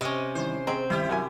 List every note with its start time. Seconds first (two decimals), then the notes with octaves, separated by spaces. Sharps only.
0.01 C3 C#4 D#5
0.35 G2 D#3 E3 C5
0.67 C4 G#4 D#5 F#5 A#5
0.90 C2 D#3 E4 G4
1.09 F#3 F#4 A#4 E5 G5 G#5